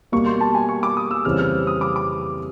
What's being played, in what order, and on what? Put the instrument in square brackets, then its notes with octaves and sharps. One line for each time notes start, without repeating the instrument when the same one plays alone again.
[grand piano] B2 G3 A#3 [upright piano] C#6
[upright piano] C6
A5
G#5
C#6
D6
D#6
E6
[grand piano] F2 C#3 E3 G3 C4 [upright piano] F6
[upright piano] F6
D#6
D6
D6